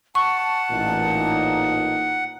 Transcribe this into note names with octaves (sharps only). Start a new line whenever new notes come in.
F#5 A5 C#6
A1 A#2 D#4